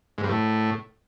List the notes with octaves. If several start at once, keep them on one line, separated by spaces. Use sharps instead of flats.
G#2
G2
A2